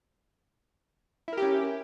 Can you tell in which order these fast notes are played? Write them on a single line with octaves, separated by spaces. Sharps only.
E4 A#4 G4 C#4